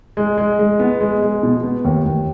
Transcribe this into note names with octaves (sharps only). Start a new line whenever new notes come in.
G#3
G#3
G#3
B3
G#3
G#3
B2
B3
D#2
D#2